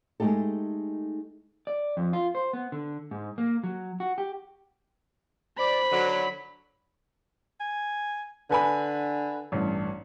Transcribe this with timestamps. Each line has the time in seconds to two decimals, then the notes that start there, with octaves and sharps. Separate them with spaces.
0.20 G#3 A3 C4 D#4 G4 A4
1.67 D5
1.97 F2
2.13 F4
2.35 C5
2.53 B3
2.72 D3
3.11 G#2
3.38 A#3
3.63 F#3
4.00 F#4
4.18 G4
5.58 C5 D5 B5
5.91 D3 F#3
7.60 G#5
8.51 D3 B4 G#5 B5
9.52 A1 G2